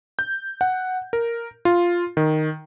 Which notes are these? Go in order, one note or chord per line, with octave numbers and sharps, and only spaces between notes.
G6
F#5
A#4
F4
D#3